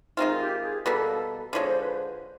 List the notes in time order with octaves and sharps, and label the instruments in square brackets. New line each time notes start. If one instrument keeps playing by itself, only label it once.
[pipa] D#3 G#3 C4 F4 [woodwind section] D#4
[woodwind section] G4
G#4
[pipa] B2 G3 A#3 [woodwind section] A4
[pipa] D3 F3 G#3 [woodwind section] C#5
[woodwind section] C5
B4